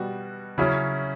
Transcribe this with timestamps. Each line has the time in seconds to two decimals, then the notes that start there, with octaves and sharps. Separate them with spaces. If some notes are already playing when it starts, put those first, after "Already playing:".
Already playing: B2 G3 B3 F#4
0.58 C#3 F#3 C#4 E4